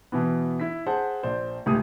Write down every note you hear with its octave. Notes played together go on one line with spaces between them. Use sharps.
B2 E3 B3
E4 B6
G#4 C5 F#5 A5
A#1 C5 D5
F1 C#2 A2 G4 D#6